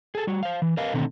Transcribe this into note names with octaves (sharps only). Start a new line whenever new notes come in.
G#4 A4
G3 F#4
C5 F5
E3
A#4 B4 D#5 F5
B2 D3 D#3 A3 C4 D#4